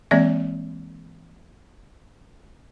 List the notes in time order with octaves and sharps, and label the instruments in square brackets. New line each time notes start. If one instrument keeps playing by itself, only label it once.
[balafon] E3 G#3 A#3 C4 D5 E5